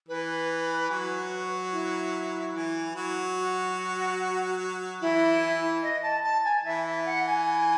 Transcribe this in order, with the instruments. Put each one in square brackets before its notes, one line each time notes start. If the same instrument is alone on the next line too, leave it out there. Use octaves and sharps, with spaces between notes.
[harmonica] E3 [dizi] B4
[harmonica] F#3
[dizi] E4
[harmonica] E3
F#3
[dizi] F#4
[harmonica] E3 [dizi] E4
[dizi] D#5
A5
A5
G#5
[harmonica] E3 [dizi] E5
[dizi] E5
F#5
G#5